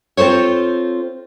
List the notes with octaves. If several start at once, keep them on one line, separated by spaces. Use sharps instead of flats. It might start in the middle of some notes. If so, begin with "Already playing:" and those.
C4 F4 A4 C5 C#5